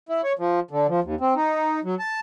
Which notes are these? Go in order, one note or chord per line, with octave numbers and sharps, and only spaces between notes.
E4
C#5
F3
D3
F3
D#2
C4
D#4
F#3
A5